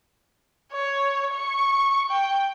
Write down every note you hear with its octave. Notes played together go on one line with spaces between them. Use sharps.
C#5
C#6
G5